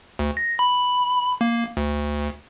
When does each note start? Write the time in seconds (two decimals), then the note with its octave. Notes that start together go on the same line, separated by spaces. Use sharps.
0.19 D2
0.37 A#6
0.59 B5
1.41 A#3
1.77 D2